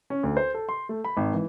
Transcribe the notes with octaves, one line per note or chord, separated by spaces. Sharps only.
C#4
D2
C5
A4
C6
A3
B5
G#1
E3